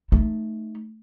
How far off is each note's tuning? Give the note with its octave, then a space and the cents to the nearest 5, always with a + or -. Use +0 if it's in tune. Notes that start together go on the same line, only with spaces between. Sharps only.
A3 -5 D#4 +0